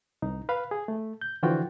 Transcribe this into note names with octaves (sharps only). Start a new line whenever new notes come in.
C2 D#4
B4 F5 B5
G#4
A3
G6
D3 E3 F3 F4 F#4 G5